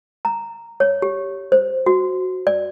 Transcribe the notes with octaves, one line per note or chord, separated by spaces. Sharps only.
A#5
C#5
G4
C5
F#4
D5